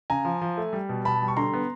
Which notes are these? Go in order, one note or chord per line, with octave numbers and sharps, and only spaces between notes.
C#3 G#5 A#5
F3
F3
A3
G3
B2
B2 A5 B5
G3
C#6
D3 A#5 C6
B3